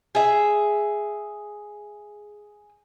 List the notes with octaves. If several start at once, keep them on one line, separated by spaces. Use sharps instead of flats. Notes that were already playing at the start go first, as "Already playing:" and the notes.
G#4 E5